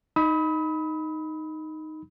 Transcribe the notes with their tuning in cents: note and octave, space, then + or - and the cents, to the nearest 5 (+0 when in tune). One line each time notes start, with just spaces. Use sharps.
D#4 +0 B5 +0 D#6 +40